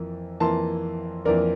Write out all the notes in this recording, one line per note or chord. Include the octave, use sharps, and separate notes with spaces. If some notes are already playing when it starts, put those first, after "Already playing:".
Already playing: F2 E3 A#3
F2 E3 A#3 A5 C6
F2 E3 A#3 A#4 D5